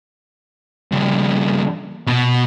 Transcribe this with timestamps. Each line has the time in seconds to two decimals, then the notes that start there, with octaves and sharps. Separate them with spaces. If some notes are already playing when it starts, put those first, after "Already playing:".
0.92 G2 C#3
2.07 B2